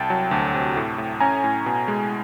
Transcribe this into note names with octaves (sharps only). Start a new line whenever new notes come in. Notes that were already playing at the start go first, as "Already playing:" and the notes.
Already playing: C2 G5 A5
F#3
D2
C3
A2
A2
C#4 G#5 A#5
A2
B2
G#3